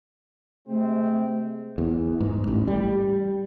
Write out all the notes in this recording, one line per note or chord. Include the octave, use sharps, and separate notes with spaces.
C3 G#3 A3 C4
E2
G#2
A1
G3